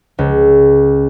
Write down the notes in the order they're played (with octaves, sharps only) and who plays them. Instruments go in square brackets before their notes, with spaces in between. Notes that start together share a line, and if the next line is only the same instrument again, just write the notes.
[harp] C#2